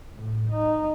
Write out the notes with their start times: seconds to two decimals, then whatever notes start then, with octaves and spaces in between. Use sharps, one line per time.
0.15 A2
0.50 D#4